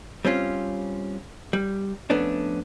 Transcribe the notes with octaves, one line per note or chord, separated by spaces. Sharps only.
G3 C4 C#4 F4
G3
F2 A3 B3 C#4 D4